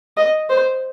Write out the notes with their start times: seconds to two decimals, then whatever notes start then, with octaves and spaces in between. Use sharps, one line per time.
0.17 D#5
0.50 C5